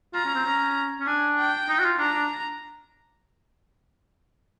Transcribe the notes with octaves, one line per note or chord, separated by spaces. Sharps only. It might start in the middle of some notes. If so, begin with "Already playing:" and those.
F4 A#5
C#4
C4
C#4
C#4
D4 G#5
G5
D#4
F#4
F4
D4 A#5
D4